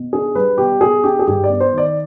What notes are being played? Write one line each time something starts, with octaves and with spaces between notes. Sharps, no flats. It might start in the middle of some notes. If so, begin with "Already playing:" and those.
Already playing: B2
D4 G#4
G3 B4
B2 G4
B2 G#4
D4 G4
G#4
G2 G4
D5
B3
C5
D#3 D5